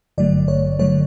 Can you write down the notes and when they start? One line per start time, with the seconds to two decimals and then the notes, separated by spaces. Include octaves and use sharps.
0.18 G#1 G2 D3 F#3 A3 D5
0.48 C#5
0.79 D3 F#3 A3 C#5